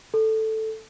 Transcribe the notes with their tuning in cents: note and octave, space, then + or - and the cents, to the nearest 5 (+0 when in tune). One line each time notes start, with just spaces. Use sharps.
A4 +0